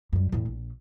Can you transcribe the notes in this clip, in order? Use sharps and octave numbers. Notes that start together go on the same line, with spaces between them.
F#2 G3
E2 A2
A#1